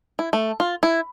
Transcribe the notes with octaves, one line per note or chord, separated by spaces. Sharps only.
E4
A3
F4
E4